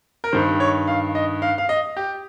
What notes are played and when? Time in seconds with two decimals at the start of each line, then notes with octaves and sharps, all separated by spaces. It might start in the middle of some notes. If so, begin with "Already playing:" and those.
0.24 A#4
0.32 G2 D#3 C5
0.60 C#5
0.88 F5
1.15 D#5
1.42 F5
1.58 F5
1.69 D#5
1.97 G4